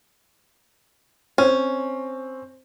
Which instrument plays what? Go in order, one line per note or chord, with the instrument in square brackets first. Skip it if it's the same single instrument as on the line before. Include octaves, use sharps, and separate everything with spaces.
[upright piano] C4 [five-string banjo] C#4